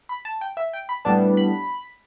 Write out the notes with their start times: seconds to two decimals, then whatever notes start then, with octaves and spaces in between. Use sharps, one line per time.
0.09 B5
0.25 A5
0.41 G5
0.57 E5
0.73 G5
0.89 B5
1.05 A2 G3 B3 D4 A5
1.37 B5